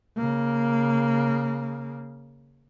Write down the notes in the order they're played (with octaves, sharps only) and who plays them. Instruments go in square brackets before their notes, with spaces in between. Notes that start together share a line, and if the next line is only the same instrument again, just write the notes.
[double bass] C#3 A#3